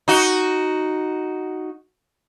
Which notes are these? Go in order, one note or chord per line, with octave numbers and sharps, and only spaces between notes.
D#4 F#4